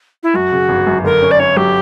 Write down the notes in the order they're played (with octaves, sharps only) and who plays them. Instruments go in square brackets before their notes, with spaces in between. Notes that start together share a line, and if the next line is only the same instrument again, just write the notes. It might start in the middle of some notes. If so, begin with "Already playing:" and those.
[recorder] E4
[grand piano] F#2 [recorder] F#4
[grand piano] C#3
G1
F#2
[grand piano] D3 [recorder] A#4
[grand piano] C#4
[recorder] D5
[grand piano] C#4 [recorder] C#5
[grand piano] F#3 [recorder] G4